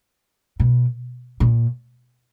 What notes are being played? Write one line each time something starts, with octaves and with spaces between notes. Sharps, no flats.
B2
A#2